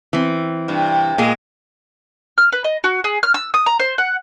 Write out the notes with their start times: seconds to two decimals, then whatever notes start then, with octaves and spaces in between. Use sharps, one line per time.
0.13 E3 C4
0.68 G2 C3
1.18 A#2 G#3 A#3 G#4
2.38 F6
2.52 B4
2.64 D#5
2.84 F#4
3.04 G#4
3.23 F6
3.34 E6
3.54 D#6
3.66 A#5
3.80 C5
3.98 F#5